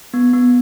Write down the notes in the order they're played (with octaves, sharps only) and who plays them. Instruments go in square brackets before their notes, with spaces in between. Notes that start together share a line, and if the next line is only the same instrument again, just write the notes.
[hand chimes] B3
B3